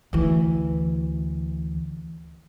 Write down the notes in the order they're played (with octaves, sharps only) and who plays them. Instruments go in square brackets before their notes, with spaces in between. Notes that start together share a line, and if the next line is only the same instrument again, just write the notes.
[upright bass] D2 E3